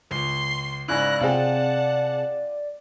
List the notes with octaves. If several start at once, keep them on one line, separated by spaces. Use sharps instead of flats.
C#2 C6
G#2 C#3 E4 D5 F#6 A#6
C3 C4 F4 G#4 F#5 G5 A5